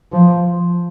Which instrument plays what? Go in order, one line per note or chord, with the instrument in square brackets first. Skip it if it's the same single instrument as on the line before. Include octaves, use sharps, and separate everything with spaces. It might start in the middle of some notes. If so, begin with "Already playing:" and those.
[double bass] F3